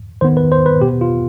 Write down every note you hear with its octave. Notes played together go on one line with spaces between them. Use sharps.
D#3 B3 C5
B4
C5
B4
B2 B3 G4
F4